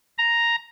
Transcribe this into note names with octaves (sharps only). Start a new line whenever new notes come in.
A#5